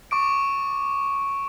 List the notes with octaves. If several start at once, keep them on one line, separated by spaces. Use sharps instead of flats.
C#6 D6 D7